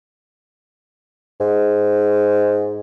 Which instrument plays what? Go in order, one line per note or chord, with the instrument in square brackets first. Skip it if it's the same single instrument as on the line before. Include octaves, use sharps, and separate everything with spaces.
[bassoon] G#2